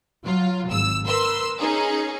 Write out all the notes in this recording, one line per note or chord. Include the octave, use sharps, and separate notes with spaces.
F#3 F4
G#1 E6
A#4 B4 C6 E6
C#4 D#4 G#4